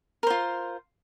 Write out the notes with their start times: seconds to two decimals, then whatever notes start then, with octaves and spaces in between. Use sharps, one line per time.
0.23 A#4
0.27 C5
0.30 F4